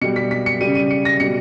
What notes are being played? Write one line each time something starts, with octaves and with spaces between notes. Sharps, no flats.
B2 G3 C#7
B6
B6
C#7
C#3 G3 D#7
D#7
C#7
A#6
B2 G3 C#7